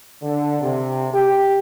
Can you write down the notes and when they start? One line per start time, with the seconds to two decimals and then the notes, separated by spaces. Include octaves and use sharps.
0.22 D3
0.62 C3
1.13 G4